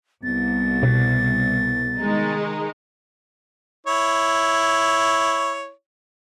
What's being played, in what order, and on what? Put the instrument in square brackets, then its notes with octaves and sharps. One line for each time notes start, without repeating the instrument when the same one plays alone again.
[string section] C2 [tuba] B3 [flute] A6
[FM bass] B2
[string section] D#3 G#3 D#4
[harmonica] E4 C#5